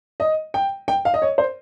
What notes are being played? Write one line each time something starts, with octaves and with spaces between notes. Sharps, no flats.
D#5
G5
G5
F5
D#5
C#5
C5